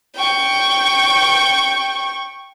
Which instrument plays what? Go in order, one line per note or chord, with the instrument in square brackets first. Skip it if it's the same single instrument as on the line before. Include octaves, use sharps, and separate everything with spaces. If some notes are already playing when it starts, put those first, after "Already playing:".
[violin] G5 C#6